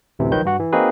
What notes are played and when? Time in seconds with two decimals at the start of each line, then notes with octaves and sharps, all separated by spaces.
0.19 A1 D2 C3 E3
0.32 D#3 F3 F#3 B4 G6
0.45 G2 D4 F#4 F#5
0.59 E3
0.73 A#3 C4 D#4 F#4 G#4 B4